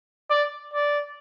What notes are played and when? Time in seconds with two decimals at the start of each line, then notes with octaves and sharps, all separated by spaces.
0.30 D5
0.74 D5